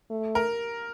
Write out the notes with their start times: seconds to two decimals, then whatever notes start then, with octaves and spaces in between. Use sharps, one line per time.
0.11 A3
0.35 A#4